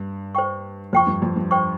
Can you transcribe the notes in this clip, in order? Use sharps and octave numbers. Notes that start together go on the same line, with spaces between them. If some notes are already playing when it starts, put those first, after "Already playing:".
Already playing: G2
C5 G5 C#6
F2 C5 G5 C#6
G2
F2
G2
C5 G5 C#6